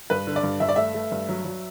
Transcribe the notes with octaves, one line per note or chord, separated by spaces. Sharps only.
G2 B4
D3
D5
G2
G2 E5
D5
A3 E5
A3
G2
F#3
F#3